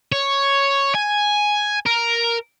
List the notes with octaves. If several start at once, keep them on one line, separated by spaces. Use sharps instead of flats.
C#5
G#5
A#4